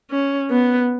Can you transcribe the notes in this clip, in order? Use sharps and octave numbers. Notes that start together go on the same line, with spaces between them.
C#4
B3